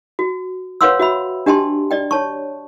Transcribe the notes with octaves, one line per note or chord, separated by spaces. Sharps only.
F#4
B4 C#5 F5 F#5 C6 E6
F#4 E5 B5
D4 G4 D#5 G5 A5 C6
D5 D#5 G5
C#5 A5 C#6